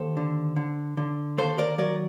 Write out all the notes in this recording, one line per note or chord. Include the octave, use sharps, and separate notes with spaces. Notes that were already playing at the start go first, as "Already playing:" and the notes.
Already playing: D#2 A4 C5
D3
D3
D3
D#2 A4 C5
A#4 D5
F#3 A#4 D5